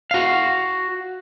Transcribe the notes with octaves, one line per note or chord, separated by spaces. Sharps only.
F#4 F5